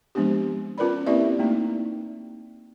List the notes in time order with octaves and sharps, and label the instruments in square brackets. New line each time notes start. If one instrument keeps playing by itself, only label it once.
[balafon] F3 G#3 B3 C4 D4 G4
C#4 F4 A#4 B4 D5 B5
A#3 C4 E4 G4 D5 E5
A3 A#3 D#4